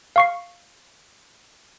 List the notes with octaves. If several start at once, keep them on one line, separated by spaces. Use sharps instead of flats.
F5 C#6 C7